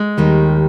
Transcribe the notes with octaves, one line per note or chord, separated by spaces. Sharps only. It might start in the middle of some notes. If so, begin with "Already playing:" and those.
Already playing: G#3
D#2 D#3 G3